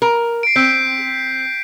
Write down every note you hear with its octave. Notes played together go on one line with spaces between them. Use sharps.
A#4
C7 D7
C4 G6 B6 D7